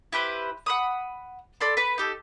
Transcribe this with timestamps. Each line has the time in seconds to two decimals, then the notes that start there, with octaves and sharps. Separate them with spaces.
0.13 E4 G4 B4 C5
0.66 F#5 B5 D#6
1.61 A4 D5 B5 C6
1.77 B4 B5
1.98 D#4 G4 A4